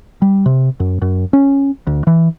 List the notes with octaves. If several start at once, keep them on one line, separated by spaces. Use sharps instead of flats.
G3
C3
F#2
F#2
C#4
D2
E3